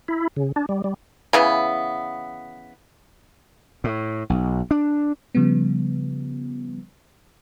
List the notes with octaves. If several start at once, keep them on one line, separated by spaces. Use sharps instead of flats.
E4
C#3
D4
G3
G3
C#3 E3 B3
A2
B1
D4
C#3 F3 G3 B3